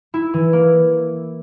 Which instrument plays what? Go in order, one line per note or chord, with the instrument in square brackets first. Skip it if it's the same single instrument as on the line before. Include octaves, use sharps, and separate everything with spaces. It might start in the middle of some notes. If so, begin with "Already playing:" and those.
[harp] E4
E3
A#3